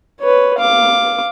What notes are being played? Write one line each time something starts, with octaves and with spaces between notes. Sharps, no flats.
B4 C#5
F5 D6